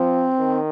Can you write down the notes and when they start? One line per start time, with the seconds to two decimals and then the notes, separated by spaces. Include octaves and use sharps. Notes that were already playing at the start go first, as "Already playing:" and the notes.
Already playing: F3 C4
0.40 D#3